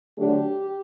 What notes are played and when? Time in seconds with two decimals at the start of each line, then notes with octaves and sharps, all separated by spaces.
0.18 D3 F#3 A3 D4 G4